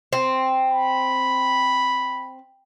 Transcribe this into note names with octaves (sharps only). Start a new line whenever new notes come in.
C4
B5